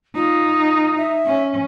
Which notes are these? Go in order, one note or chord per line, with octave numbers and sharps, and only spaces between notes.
D#4 F4
E5
C#4